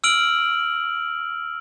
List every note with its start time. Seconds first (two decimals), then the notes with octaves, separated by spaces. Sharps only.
0.04 E6 F6 D7 F#7